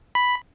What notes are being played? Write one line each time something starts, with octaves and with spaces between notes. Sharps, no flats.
B5